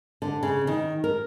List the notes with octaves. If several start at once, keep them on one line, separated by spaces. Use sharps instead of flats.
D3
C#3
D#3
A#4